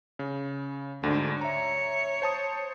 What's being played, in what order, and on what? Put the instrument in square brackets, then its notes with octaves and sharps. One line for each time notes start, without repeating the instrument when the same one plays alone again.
[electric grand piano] C#3
[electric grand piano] D2 G#2 [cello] D3
[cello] C#5 [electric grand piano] E5 A#5
[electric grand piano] C5 A5 D#6